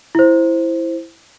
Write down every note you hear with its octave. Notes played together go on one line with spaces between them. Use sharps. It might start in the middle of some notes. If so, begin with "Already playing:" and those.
E4 C5